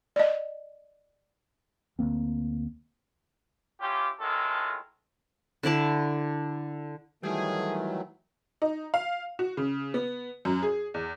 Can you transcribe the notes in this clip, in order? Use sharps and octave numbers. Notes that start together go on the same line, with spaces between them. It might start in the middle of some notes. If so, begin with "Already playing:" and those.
D5 D#5
D2 A3 A#3 C4
C#4 E4 F4 G4
A2 D#3 G#3 F4 A4 A#4
D3 E4 D5 A5
D#3 E3 F#3 G3 A3 G#4
D#4
F5
F#4
C#3
B3
F#2
G#4
E2